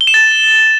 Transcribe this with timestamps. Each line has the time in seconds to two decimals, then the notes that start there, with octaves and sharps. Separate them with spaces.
0.01 G7
0.07 E7
0.14 A6